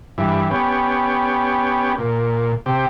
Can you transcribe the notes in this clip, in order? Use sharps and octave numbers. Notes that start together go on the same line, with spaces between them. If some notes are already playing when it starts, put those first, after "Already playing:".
G2 E3
B3 C#4 G4
A#2
C3 G4